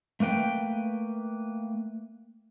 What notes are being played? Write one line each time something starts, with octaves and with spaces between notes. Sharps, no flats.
A3 A#3 B4 G5